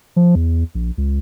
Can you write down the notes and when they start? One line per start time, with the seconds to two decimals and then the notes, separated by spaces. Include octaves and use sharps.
0.16 F3
0.35 E2
0.75 A#1
0.98 C#2